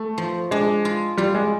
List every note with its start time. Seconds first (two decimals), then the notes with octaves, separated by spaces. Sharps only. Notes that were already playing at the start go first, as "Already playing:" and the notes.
Already playing: A3
0.18 F3
0.51 G#3 D4
0.85 F4
1.18 G3 F4
1.35 G#3